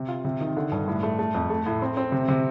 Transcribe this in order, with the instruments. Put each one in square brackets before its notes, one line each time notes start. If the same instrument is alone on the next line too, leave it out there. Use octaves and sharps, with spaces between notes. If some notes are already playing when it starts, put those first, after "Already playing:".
Already playing: [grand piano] C3
F4
C3
D#3
D3
G2
A2
A3
A3
F2
A3
A2
C4
C4
C3
C3